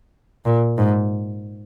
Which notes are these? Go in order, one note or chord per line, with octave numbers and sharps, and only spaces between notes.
A#2
G#2